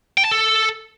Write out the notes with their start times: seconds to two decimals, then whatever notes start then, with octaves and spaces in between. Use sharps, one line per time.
0.18 G5
0.25 A5
0.31 A4